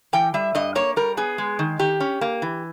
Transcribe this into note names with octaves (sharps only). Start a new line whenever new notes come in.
E3 G5
G3 E5
G2 D#5
A#3 C#5
G3 A#4
B3 G#4
G#3
D#3
D#3 G4
C#4
A#3
E3